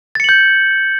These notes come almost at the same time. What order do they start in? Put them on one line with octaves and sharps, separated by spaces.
A6 C#7 F#7 G6